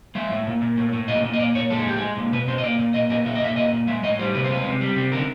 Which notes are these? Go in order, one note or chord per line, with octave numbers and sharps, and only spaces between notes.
G#3 E5
A2
A#2
A#2
A2
A2
A#2 D#5
A#2
D#5
A#2 D5
A#2 C#5
G#3 A4
G#4
A2 G4
G#3 G#4
A#2
B2 B4
B2 C5
D#5
A#2 D5
A#2
A#2 D#5
A#2 D#5
A#2 E5
D#5
A#2 E5
A#2 D#5
A#2
G#3 E5
A2 D#5
G3 C5
C3 B4
C5
G#3 B4
C3
G3
C3
D3 A#4